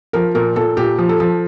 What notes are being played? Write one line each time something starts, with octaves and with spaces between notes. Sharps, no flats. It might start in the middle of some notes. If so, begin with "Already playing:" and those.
F3 A#4
A#2 A#4
A#2 A4
A#2 G4
F3
A4
F3